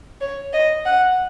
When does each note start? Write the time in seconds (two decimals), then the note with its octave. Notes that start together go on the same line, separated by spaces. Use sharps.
0.21 C#5
0.53 D#5
0.85 F#5